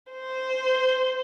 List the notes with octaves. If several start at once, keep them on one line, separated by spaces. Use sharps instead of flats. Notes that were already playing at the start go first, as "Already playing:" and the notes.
C5